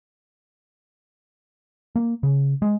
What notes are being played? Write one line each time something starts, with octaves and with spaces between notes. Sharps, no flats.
A#3
C#3
G#3